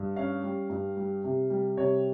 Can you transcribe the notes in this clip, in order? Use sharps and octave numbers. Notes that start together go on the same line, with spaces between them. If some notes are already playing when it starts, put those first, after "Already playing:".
Already playing: G2
C#4 F5
G3
G2
G3
C3
G3
C3 C#5